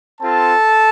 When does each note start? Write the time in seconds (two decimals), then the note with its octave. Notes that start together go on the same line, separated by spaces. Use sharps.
0.21 C4 F4 A4 A5